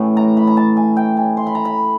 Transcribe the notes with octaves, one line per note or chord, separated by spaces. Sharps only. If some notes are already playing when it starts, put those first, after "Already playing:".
Already playing: A2 E3 A3 C#4
A#5
B5
A#5
A5
G#5
G5
G#5
C6
B5
A#5
B5